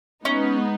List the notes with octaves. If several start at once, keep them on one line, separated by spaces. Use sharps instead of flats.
G#3 B3 C#4 D#4